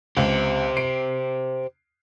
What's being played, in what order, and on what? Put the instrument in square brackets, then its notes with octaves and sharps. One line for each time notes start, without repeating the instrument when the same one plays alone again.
[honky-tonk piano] C#2 [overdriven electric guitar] G4 C5
[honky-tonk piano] C7 D7